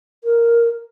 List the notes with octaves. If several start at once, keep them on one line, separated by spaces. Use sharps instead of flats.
A#4